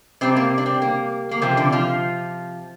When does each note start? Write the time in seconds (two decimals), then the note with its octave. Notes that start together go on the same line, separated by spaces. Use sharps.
0.21 C3 G3 C4
0.36 A#3
0.58 D4
0.66 C4
0.82 A#3
1.31 A#3
1.42 C3 F3 C4
1.57 D3 D4
1.72 F3 F4